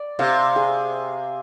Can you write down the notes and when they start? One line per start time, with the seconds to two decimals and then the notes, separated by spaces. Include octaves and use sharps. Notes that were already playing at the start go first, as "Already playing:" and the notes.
Already playing: D5
0.19 C3 F5
0.56 G#4